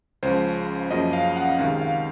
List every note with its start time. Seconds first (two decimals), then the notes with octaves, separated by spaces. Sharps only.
0.23 C#2 C#3 F3 C5
0.91 F#2 C#3 F3 A#3 D#5
1.13 F5
1.36 F#5
1.59 C#2 C3 D#3 G#3 F5
1.81 F5